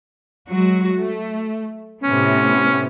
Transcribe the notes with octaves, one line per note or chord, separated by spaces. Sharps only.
F#3 G#3 F#4
A3
A2 C3 B3 C#4